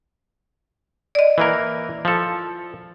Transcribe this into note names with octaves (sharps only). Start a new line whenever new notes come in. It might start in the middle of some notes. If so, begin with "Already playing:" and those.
D5 D#5
E3 A#3 A#4
F3 A4